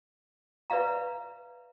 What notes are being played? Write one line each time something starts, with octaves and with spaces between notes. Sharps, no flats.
B4 D5 E5 F5 A#5